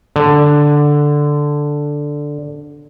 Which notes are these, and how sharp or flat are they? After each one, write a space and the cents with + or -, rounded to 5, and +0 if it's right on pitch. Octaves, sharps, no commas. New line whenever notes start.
D3 +0